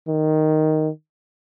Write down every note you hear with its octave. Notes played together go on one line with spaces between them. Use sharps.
D#3